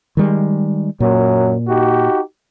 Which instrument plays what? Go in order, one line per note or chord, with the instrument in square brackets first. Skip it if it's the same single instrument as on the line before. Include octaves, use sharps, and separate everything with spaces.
[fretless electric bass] D#3 G3 G#3
[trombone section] F#2 F#3 [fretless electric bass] A#2
[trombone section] D#4 F#4 G4